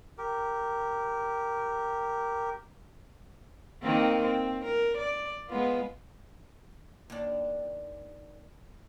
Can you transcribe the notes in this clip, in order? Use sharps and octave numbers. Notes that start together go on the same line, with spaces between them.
G4 A#4
D#3 A#3 C4
C4
A#4
D5
G#3 B3 F4
D#2 D4